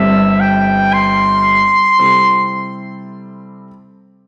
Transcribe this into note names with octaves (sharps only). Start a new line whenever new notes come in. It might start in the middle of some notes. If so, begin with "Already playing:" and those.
Already playing: G1 G2 G3 C4 E5
G5
C6
C3 G3 C4 E4 A4